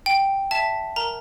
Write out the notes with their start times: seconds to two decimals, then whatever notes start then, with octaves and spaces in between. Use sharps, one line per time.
0.06 G5
0.51 E5 A5
0.96 A#4 A#5